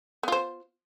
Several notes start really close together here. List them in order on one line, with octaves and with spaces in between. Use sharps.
B3 F4 C5